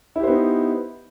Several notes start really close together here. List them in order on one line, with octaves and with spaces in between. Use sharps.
E4 G4 C5 B3 D#4